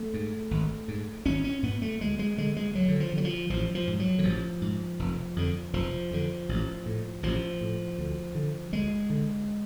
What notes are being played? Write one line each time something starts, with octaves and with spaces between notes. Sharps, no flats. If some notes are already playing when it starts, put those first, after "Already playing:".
Already playing: A3
G#2
G#1
G#2
G#1 C#4
C#4
G#2 B3
A3
D2 G#3
G#3
D3 G#3
G#3
D2 F#3
D3
F3
D3
F#3
F3
A1 F3
F3
G#2
F#3
D3
A1 F3
G#2
F1
F2 D3
F1 F3
F2 D3
A1
A2
A1 F3
A2
D2
D3
D2 G#3
D3